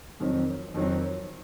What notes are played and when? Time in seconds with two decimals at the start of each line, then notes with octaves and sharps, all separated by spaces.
0.20 F2 D#3 F#3 C4
0.74 F2 D#3 F#3 C4